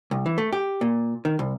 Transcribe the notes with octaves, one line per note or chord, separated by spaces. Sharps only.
C2
E3
A3
G4
A#2
D#3
C2